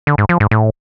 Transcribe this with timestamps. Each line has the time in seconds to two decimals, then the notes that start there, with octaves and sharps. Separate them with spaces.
0.07 D3
0.18 G#2
0.29 F3
0.40 G#2
0.51 A2